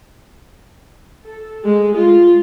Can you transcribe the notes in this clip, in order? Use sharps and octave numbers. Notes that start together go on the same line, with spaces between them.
A4
G#3
F4